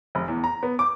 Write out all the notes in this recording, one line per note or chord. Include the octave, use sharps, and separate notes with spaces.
F1
E2
A#5
B3
D6